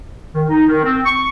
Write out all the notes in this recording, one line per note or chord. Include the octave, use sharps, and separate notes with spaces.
D#3
D#4
D#3
C4
C#6